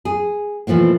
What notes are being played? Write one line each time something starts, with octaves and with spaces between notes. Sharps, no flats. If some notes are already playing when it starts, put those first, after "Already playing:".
G#4
B2 E3 F3 A3 A#3